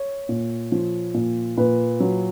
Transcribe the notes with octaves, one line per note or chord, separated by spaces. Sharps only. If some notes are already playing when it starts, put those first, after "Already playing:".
Already playing: C#5
A#2
F3
A#2
A#2 B4
F#3